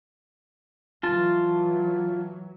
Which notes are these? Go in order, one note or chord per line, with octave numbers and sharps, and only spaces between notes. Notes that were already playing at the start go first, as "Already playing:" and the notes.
E3 F#3 F4 A5